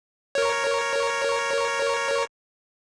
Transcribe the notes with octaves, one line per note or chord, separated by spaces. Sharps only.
A#4 C#5